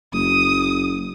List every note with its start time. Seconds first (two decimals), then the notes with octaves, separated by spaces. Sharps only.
0.13 F#1 D#6